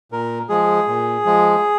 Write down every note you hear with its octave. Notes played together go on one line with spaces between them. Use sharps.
A#2 A#4
F3 G#3 G#4
A#2
F3 G#3